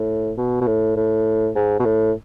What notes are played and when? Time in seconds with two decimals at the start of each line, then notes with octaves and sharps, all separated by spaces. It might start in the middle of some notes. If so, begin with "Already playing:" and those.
Already playing: A2
0.38 B2
0.61 B2
0.67 A2
0.96 A2
1.55 G#2
1.79 B2
1.85 A2